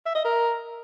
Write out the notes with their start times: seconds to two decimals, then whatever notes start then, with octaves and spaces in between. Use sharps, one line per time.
0.06 E5
0.15 D#5
0.25 A#4